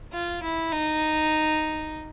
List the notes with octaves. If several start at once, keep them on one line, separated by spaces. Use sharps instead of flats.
F4
E4
D#4